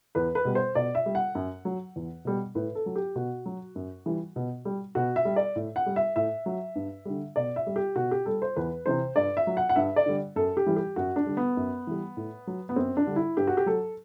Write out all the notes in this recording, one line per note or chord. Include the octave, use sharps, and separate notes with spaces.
E2 B4
B4
B2 G3
C5
B2 D5
E5
G3
F#5
F#2
F#3
E2
B2 G3
A2 B4
A4
F#3
G4
B2 F#4
F#3
F#2
E3 G3
B2
G3
B2 F#4
E5
G3
D5
A2
F#5
G3
E5
A2 E5
F#3
G2
D3 G3
B2 D5
E5
G3
G4
B2 F#4
G4
G3 A4
C5
E2 B4
C3 E3 C5
G2 D5
E5
F#3
F#5
F#5
G2 E5
D5
D3 G3
F#2 A4
G4
E3 G3
G4
F#2 F#4
D4
D3 G3
B3
F#2
E3 G3
A2
F#3
B3
F#2 C4
D4
D3 G3
E4
G2 G4
F#4
G4
F#3 A4